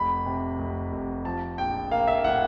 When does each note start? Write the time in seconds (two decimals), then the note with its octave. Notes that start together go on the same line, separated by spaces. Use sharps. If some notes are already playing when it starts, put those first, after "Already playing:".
Already playing: F1 B5
0.26 C3
0.59 F1
0.93 F1
1.25 F3 A5
1.58 A#1 G5
1.91 A#3 F5
2.07 E5
2.24 A2 F#5